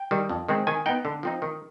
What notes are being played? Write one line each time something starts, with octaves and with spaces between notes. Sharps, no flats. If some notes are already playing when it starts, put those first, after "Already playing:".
Already playing: G5
D#3 G3
F2
D#3 G#3 C4
D#3 G#5
B3 D#4 G5
D3
F3 C4 D#4
D#3